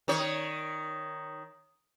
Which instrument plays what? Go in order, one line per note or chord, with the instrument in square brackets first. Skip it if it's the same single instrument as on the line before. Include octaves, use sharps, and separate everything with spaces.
[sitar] D#3 C#5